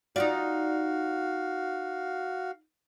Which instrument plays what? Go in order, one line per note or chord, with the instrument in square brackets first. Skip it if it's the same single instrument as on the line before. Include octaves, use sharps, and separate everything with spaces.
[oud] D#4 F4 D5 [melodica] F#4 F5